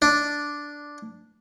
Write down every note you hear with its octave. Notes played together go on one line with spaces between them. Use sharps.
D4